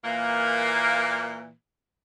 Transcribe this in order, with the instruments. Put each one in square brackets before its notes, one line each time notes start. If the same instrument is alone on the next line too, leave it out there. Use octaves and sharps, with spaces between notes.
[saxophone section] A#2 E3 A#3